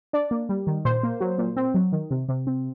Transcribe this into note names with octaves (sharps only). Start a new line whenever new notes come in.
D4 D5
A#3
G3
D#3
A#2 C5
A#3
F#3
A#2
C4
F#3
D#3
C3
C3
C4